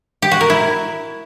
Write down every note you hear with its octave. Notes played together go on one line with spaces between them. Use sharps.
G4
F#4
A#4
E4